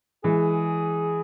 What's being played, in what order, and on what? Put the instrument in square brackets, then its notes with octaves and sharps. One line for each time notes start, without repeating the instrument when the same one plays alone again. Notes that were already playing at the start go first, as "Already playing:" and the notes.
[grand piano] E3 G#3 [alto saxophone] G#4